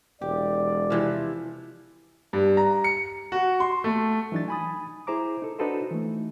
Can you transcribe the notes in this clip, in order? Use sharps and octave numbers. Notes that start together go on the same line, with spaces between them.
E1 G4 D5
C3 E3 F3
G2
A#5
C#7
F#4
C6
A3
E3 F#3 D4 D#4 A6
G#5 B5 D#6
E4 G#4 C5 A#5 D6
D#4 A4
D4 D#4 F#4 A4 B4 C5
E3 A3